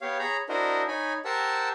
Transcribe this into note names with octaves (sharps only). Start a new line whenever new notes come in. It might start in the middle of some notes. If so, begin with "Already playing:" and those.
B3 G4 C#5 F5
G#4 C#5 A#5 B5
D4 E4 F#4 A#4 C5 D#5
D#4 C#5 G#5 B5
G4 A#4 C5 F#5 A5 E6